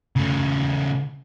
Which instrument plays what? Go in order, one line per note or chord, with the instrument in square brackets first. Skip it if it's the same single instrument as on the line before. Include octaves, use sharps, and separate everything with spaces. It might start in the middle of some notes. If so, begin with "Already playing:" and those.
[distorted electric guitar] C#3 A3